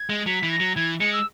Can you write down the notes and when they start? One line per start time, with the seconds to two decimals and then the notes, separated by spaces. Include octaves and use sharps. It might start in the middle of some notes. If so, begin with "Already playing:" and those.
Already playing: G#6
0.10 G#3
0.26 F#3 B6
0.43 E3
0.51 A#6
0.60 F#3
0.76 E3 G#6
1.01 G#3 C#7
1.13 E6